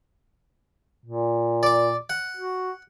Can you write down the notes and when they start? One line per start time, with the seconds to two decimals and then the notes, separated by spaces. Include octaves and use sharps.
1.06 A#2
1.63 D5 D6
2.10 F#5
2.37 F#4